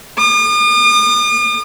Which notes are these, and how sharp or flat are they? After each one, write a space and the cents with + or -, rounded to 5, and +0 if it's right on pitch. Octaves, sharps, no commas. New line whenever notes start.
D#6 -45